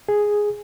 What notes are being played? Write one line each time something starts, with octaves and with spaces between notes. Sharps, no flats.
G#4